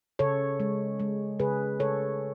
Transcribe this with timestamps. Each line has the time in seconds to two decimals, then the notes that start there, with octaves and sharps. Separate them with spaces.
0.19 C#3 A4 C#5
0.60 G#3
1.00 G#3
1.39 C#3 G#4 B4
1.80 C#3 A4 C#5